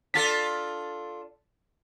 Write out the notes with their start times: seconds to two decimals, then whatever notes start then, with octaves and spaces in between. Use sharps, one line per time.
0.14 D4 F4 A4 A6 B6